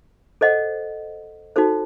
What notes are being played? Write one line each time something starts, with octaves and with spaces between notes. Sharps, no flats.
A4 C5 D#5 F#5
D#4 F#4 A4 C5